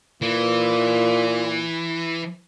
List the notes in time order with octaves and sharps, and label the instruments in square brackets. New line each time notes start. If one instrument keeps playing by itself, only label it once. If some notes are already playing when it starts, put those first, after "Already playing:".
[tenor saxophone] A#2 [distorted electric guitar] E3